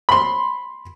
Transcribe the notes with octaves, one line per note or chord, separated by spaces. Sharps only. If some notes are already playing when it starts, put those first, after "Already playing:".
B5 C6